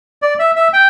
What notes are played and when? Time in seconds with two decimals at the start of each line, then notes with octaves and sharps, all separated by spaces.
0.22 D5
0.39 E5
0.56 E5
0.73 G5